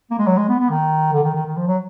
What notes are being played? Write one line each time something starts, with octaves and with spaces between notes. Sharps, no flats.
A#3
G#3
F#3
G#3
B3
B3
D#3
D3
D#3
D#3
D#3
F3
F#3